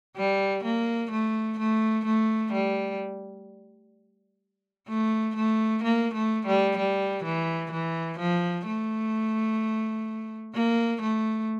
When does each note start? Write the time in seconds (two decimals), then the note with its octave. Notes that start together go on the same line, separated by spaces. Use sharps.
0.16 G3
0.64 A#3
1.11 A3
1.59 A3
2.05 A3
2.52 G3
4.88 A3
5.36 A3
5.83 A#3
6.14 A3
6.46 G3
6.77 G3
7.24 E3
7.71 E3
8.19 F3
8.66 A3
10.54 A#3
11.01 A3